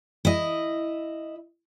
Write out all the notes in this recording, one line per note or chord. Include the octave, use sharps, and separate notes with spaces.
E4 D#5